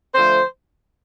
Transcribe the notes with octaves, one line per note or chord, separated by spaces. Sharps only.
D3 F3 A3 C5